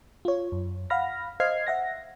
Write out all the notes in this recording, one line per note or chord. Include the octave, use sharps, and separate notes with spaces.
F4 C#5
F#2
F5 F#5 B5 F6 A#6
C5 D#5 F5 F6 G#6 C7
E5 F#5 A#6